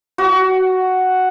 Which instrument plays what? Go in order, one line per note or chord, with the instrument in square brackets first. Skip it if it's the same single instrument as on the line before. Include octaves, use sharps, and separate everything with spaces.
[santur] F#4